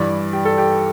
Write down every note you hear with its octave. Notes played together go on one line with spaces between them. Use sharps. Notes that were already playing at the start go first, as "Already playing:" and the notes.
Already playing: G2 E3 D5
G4
A4
G4